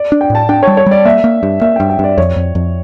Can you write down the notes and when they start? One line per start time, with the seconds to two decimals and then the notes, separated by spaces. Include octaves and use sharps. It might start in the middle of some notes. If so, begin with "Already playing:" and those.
Already playing: D5
0.12 D4
0.21 G5
0.30 A2
0.35 A5
0.49 D4 G5
0.63 G3 C#5
0.77 C#5
0.86 G3 D5
1.05 A#3 E5
1.24 A#3
1.43 G2
1.61 A#3 E5
1.76 G2 G5
1.89 G5
1.99 G2 D5
2.18 F2 C#5
2.36 F2
2.55 F2